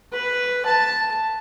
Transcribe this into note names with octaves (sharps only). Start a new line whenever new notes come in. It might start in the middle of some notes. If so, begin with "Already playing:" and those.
B4
A5